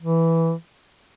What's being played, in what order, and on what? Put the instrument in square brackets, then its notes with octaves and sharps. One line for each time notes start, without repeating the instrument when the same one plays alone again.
[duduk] E3